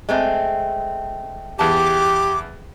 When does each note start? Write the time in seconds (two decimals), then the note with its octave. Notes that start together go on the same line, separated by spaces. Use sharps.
0.09 G#3 A3 C4
1.59 E2 G4 A5 D6